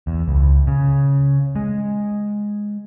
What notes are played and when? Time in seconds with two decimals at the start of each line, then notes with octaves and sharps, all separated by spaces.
0.07 E2
0.28 C#2
0.67 C#3
1.56 G#3